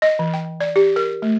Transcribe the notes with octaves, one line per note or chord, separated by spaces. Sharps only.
D#5
E3
G5
D5
G4
A#4
A3